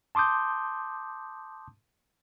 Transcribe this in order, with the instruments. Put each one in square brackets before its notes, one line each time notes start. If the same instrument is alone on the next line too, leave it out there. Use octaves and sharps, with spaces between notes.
[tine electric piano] A5 C6 D6 D#6 G6